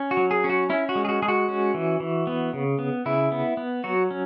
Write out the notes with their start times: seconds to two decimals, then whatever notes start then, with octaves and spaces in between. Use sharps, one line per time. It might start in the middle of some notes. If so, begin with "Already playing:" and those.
Already playing: C#4
0.11 F#4
0.17 F#3
0.31 G#4
0.44 C#4
0.50 F#4
0.70 C#4 E4
0.89 F#4
0.96 G#3
1.05 G#4
1.09 F#4
1.22 G#3 G#4
1.28 F#4
1.49 C#4
1.74 E3
2.00 E3
2.27 B3
2.53 C#3
2.79 B3
3.06 C#3 E4
3.32 B3
3.57 B3
3.84 F#3 F#4
4.11 C#4